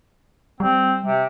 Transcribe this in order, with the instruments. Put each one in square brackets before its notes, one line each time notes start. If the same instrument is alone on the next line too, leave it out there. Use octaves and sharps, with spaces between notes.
[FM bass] G3 [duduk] C4
[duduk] C3